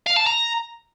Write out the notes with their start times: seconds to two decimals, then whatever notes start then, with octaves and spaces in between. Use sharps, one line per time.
0.07 F5
0.17 A5
0.26 A#5